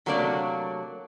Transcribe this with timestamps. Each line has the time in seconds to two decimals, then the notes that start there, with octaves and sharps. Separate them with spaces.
0.06 C3 F#3 A3 A#3 D4 D5